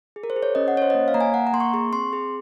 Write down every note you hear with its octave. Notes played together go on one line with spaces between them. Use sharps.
G#4
A#4
C5
G#4
C#5
C#4 D#5
F#5
C#4 C#5
C5
D#5
A#3 C#5
F5
A#3 A#5
G#5
A#3 F#5
A#5
A#3 C6
C#6
G#4 C#6
C4 C6
G#4